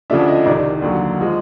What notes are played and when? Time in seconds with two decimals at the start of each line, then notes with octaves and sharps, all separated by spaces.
0.10 D2 C#3 F3 A3 D4 E5
0.28 D#5
0.46 C2 C3 D#3 D5
0.82 D#2 D3 F#3
1.20 F3 G#3